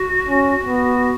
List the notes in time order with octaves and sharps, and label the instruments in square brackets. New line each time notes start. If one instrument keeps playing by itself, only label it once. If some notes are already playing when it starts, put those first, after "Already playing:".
Already playing: [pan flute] F#4
[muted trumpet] C#4
B3